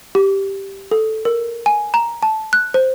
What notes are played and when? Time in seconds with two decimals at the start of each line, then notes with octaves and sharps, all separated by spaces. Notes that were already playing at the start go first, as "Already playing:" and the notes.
0.15 G4
0.91 A4
1.25 A#4
1.66 G#5
1.94 A#5
2.23 A5
2.53 F#6
2.74 C5